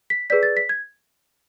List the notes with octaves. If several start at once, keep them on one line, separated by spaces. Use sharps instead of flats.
B6
G#4 B4 D5 B6
A6
B6
G#6